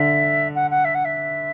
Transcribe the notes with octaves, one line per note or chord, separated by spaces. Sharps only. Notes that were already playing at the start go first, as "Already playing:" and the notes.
Already playing: D3 E5
F#5
F#5
E5
F#5
E5